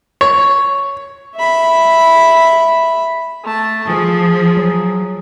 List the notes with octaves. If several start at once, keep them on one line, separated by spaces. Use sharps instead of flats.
C#5
E5 B5
A3 A5
F3 G#4
F#3